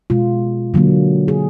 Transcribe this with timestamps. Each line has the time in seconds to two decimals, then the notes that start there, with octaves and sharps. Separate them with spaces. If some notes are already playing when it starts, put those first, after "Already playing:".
0.10 B2 G#3 F4
0.74 D3 F#3 A#3
1.28 G#4